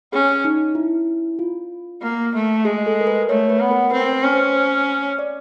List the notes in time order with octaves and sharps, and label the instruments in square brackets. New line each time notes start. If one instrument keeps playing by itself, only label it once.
[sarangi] C#4 [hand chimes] G#4
[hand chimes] D#4
E4
F4
[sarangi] A#3
A3
[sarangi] G#3 [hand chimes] G#4
[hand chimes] A4
A#4
B4
[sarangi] A3 [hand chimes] C#5
[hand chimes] B4
[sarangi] B3
[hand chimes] A#4
[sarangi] C4 [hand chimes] B4
[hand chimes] C5
[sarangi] C#4
[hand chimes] C5
C#5
D5